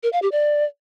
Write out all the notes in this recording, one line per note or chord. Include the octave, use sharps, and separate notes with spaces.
A#4
F5
G4
D5